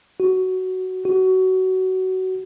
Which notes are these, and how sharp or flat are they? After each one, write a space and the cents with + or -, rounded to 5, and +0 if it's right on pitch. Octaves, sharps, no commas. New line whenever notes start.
F#4 +10
F#4 +20